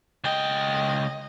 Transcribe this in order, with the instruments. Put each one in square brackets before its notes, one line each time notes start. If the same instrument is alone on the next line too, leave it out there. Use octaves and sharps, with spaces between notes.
[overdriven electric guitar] C#2 G5 [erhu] D#5